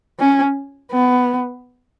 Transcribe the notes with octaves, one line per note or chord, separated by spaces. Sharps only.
C#4
B3